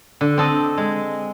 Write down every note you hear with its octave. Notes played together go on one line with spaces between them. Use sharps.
D3
C4 A4 D#5
G#3